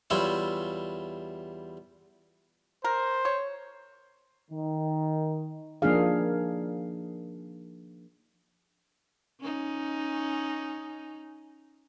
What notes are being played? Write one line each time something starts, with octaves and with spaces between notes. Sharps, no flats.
E2 G3 E4 F4 C5 C#5
A#4 C5
C#5
D#3
F3 A#3 D4 D#4 G#4 F5
C#4 D#4